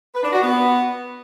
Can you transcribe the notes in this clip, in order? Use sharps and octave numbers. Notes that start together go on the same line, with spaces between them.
B4
D4
F#4
B3